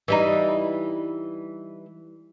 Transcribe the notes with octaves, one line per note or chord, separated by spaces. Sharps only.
E3 G3 D#4